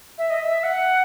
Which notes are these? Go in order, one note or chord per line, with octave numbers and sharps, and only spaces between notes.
E5
D#5
E5
F#5